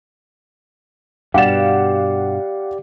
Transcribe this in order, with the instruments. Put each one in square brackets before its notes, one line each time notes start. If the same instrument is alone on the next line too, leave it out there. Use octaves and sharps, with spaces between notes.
[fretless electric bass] G2 B2 [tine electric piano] G4 D5 [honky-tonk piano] F5 F#5 E7